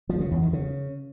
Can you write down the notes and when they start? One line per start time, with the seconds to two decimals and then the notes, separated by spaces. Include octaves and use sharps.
0.09 F3
0.20 C#3
0.31 E2
0.42 D#3
0.53 C#3